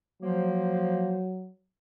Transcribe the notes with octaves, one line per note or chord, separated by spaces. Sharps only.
F3 F#3 A#3 C5